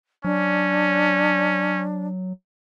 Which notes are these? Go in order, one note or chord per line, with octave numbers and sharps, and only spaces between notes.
F#3 C#4 D4